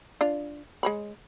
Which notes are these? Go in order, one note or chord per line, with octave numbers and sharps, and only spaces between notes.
D4 F4
G#3 C#5 B5